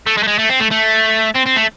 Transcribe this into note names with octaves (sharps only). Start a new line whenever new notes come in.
A3
G#3
A3
G#3
A3
C4
A3
A3
C4
C4
A3